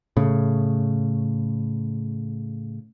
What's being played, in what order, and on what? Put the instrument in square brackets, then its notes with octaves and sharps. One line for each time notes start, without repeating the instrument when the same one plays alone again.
[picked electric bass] A2 C#3